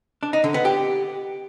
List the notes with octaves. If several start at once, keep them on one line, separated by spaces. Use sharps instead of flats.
D4
D#4
D3
B3
G4